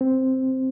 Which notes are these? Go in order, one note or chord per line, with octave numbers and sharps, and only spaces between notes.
C4